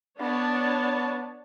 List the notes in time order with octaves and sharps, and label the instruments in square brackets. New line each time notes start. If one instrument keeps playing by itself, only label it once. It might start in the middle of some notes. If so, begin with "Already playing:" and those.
[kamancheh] B3 [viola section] D4 C#5 A5